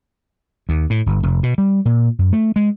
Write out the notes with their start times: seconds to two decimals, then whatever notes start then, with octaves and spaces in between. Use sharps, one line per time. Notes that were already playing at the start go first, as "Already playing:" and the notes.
0.69 D#2
0.90 A2
1.06 G1
1.23 F1
1.43 B2
1.58 G3
1.85 A#2
2.19 F#2
2.33 A3
2.56 G#3